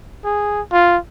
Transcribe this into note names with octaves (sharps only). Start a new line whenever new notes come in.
G#4
F4